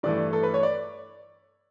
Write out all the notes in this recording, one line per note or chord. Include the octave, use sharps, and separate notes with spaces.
G2 E3 A3 D5
A4
B4
C#5
D5